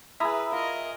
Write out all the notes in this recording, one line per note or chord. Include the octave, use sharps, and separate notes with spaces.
E4 G#4 B4 E5 G#5 A#5 D#6
F4 A#4 D#5